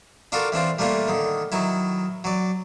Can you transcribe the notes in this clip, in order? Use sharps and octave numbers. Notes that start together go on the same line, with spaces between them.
D4 F4 F#4 A4 A#4 D5
E3 C4 D4 F4
G3 A3 A#3 D4 F4
D3 D#3
D#3 F#3 E4
F#3 D5